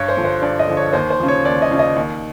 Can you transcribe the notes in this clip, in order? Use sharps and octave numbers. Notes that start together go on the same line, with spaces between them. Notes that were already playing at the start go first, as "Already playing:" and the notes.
Already playing: G2 C#5
C5
D3 F3
C5
G2 D5
D#5
D3 F3
C#5
D#2 C5
C5
C#3 F3
C#5
D#2 D5
D#5
C#3 F3
D#5
D#2